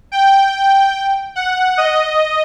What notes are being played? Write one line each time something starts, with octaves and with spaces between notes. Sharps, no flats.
G5
F#5
D#5